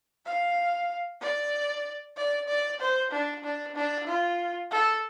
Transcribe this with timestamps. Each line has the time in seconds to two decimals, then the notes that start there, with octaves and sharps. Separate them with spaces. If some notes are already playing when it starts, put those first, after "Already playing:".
0.25 F5
1.21 D5
2.16 D5
2.48 D5
2.80 C5
3.11 D4
3.44 D4
3.75 D4
4.07 F4
4.71 A4